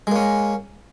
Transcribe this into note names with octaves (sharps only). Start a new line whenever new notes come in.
G#3 A#3 C#4